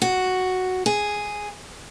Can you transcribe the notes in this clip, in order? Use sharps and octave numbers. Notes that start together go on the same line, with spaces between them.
F#4
G#4